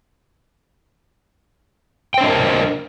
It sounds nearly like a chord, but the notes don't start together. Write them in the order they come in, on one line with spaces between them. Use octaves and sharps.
G5 C5 D4 D#5 A#4